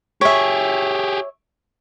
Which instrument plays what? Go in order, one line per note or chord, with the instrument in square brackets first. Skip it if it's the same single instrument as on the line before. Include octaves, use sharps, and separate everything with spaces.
[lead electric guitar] G4 G#4 [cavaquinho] C#5 E5